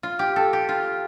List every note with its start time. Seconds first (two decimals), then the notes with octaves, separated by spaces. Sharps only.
0.03 F4
0.19 G4
0.36 A4
0.53 G4
0.69 F4